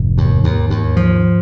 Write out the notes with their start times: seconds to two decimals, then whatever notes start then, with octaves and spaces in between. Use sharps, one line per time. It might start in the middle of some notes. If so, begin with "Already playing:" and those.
Already playing: F1 G#2
0.18 D#2
0.44 D#2
0.70 D#2
0.96 F3